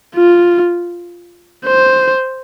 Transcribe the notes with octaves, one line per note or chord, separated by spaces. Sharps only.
F4
C5